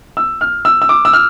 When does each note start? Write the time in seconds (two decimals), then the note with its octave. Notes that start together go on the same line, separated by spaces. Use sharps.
0.17 E6
0.41 F6
0.65 E6
0.82 E6
0.89 D6
1.05 E6
1.13 F6